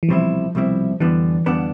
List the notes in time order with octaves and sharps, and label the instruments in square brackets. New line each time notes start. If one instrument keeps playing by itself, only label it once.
[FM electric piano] E3
[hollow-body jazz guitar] C2 B2 G3 C4 E4 [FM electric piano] F3
[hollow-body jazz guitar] C2 B2 G3 C4 E4
[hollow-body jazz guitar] F2 D3 G3 B3 D4 [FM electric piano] E3
[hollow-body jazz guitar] F2 D3 G3 B3 D4